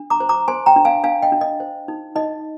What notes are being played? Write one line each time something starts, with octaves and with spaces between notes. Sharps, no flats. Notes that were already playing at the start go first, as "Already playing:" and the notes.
Already playing: D4
A#5 D6
C5
A#5 D6
C5 G#5 C6
G5 A#5
D4
F5 G#5
D4 F5 G#5
D#5 G5
D4
D#5
C5
D#4
D#4 D#5